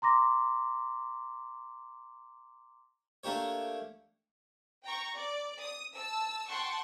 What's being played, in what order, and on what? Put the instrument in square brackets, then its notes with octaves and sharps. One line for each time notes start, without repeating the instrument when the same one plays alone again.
[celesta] A#5 C6 D6 A#6
[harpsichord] A3 A#3 D4 G4 C#5
[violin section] G5 A#5 C#6
D5
D#6
A5 E6
F#5 G5 A5 C6 C#6